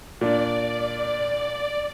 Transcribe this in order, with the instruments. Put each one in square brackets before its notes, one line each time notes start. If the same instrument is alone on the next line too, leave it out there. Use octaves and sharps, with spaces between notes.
[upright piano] A#2 D4 [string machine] D5